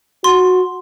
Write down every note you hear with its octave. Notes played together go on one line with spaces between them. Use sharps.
F#4 C6